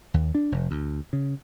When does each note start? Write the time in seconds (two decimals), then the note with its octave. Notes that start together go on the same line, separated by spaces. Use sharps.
0.14 D#2
0.35 D4
0.52 F1
0.71 D2
1.13 C#3